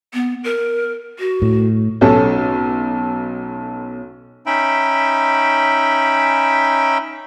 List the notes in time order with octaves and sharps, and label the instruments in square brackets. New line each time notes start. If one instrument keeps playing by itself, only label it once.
[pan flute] B3
A#4
F#4
[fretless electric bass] A2
[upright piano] B1 C#4 A4
[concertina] C#4 D#4 E5 G5 B5